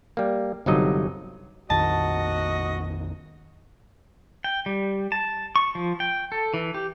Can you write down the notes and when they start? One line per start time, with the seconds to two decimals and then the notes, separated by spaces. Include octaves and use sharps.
0.17 G3 A#3
0.66 G1 G2 C3 F#3 D#4 D#5
1.70 A#1 F2 D#3 F#4 D#5 A5
4.44 G5
4.66 G3
5.12 A5
5.56 C#6
5.75 F3
6.00 G5
6.32 A4
6.54 E3
6.75 G4